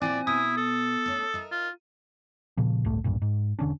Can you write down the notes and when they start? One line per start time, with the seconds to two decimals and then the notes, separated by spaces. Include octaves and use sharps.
0.02 A#2 F3 C4 E4 D5 G#5
0.27 B2 E4 D#6
0.57 A4
1.06 A3 C#4 D4
1.34 D#4 A#4 E5
1.52 F4
2.57 A#2 C#3 F3
2.85 G1 C#2 A2 A3
3.04 F1 B1 G2 A#2
3.22 G#2
3.59 E1 D3 C#4 D4